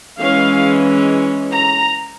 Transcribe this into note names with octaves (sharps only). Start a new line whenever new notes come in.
E3 G#3 C#4 F5
A#5